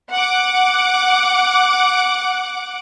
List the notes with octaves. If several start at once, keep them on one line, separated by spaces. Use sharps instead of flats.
F#5 D6